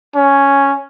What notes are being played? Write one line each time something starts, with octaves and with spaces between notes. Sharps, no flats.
C#4